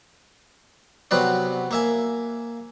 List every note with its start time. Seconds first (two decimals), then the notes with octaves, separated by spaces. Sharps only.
1.11 C3 F#3 B3 B4 D5
1.71 A#3 E5 G#5